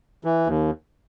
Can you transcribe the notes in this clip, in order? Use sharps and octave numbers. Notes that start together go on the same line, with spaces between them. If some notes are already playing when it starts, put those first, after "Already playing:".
E3
D#2